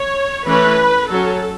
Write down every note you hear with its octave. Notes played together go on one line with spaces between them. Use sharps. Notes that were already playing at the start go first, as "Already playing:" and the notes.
Already playing: C#5
E3 A3 C#4 B4
F#3 C#4 A4